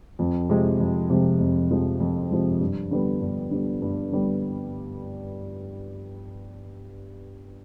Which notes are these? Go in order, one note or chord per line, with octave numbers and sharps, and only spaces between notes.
F2
C3 F3 G#3
F2
C3 F3 G#3
F2
C3 F3 G#3
F2
C3 F3 G#3
G2
D3 G3 B3
G2
D3 G3 B3
G2
D3 G3 B3